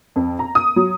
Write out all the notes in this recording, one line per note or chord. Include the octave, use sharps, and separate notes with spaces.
F2
A#5
D#6
F#3